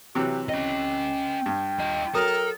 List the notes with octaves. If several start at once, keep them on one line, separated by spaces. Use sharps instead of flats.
C3 E3 F#3 G4
C#4 D#5 G5
G2
F4 D#5
F#3 A4 A#4 D#6